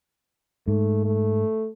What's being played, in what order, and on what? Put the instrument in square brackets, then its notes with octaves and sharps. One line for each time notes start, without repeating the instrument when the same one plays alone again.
[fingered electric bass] G#2 [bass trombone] A3
[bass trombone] A3